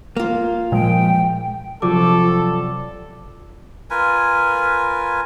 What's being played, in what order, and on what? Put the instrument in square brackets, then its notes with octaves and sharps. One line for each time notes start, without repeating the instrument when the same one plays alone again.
[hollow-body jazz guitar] A#3 F4
[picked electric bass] A#2 F3 G#3 [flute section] G5
[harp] C3 F#3 D5 [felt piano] F3 [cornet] A4 [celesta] D6
[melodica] F4 A#4 B4 G#5